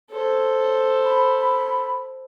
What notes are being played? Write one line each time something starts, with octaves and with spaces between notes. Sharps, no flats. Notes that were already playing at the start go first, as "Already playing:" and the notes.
A4 C5 C#5
B5